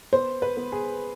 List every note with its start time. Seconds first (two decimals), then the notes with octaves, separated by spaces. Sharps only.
0.13 B3 C5
0.42 B4
0.57 B3
0.72 G#4